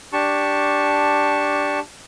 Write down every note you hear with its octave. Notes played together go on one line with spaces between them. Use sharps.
D4 G4 A5 C#6